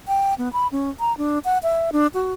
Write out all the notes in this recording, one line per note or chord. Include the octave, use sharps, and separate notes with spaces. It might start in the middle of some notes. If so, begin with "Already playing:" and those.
G5
B3
B5
C#4
A#5
D4
F#5
E5
D4
F#4